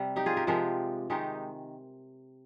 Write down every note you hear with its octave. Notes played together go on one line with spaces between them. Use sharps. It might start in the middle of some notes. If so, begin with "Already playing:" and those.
Already playing: C3 G3
D#4 G4
F4 G#4
G4 A#4
C3 F3 G#3 G4 A#4
C3 D#3 G#3 D#4 G4